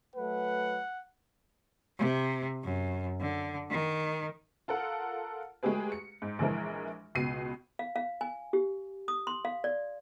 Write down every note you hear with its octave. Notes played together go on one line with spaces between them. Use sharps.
F#3 A3 B4 F#5
C3
F#2
D3
D#3
F4 A4 A#4 F#5
F#3 G#3 A3 G4 G#4 B4
C#7
G#2
A#1 E3 G#3 A#4
C#2 B2 B3 C7 D#7
F5
F5
G#5
G4
D#6
C6
F5
D5